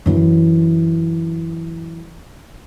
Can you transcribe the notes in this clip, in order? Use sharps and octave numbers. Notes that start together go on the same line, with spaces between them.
F#2 E3